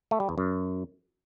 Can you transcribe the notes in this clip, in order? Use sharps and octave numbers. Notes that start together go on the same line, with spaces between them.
A3
G3
E2
F#2